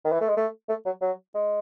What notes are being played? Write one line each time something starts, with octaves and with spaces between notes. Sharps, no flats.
D#3
E3
A3
G#3
A3
A3
F#3
F#3
G#3